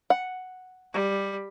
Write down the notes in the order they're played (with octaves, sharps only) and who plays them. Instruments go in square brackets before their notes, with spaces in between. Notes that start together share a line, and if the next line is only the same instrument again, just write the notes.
[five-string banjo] F#5
[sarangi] G3